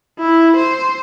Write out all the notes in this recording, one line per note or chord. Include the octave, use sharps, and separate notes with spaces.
E4
C5